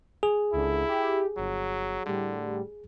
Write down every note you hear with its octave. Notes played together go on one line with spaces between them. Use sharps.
G#4
C#2 D3 E4
G4
G1 F#3
A2 D3 G3